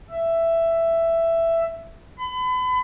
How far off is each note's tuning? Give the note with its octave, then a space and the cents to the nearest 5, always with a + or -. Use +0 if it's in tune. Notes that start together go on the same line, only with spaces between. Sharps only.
E5 +10
B5 +35